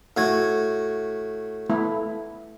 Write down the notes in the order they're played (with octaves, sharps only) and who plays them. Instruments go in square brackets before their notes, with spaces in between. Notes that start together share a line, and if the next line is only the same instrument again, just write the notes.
[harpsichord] A2 F#4 G#5
[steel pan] A3 B3 E4